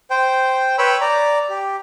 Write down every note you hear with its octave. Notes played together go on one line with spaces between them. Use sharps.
C5 G5
B4 C#5 G5 B5 E6
D5 A#5
G4